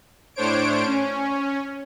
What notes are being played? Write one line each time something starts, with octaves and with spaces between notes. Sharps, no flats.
A2 D4 C5 C#5 D7
C#4